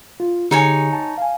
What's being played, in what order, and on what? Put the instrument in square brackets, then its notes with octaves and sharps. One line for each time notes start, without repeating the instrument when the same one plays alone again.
[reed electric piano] F4
[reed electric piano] D3 G4 G#4 [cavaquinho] D#4 C#5 G#5
[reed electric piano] A5
F5 G#5